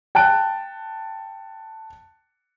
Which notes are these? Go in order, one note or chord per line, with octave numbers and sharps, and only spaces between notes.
G5 A5 F#6 D7